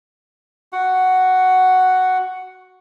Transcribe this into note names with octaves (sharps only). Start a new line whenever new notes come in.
F#4 F#5